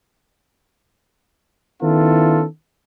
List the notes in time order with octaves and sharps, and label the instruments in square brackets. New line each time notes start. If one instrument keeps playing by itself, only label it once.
[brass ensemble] D#3 B3 C#4 E4 F4 A4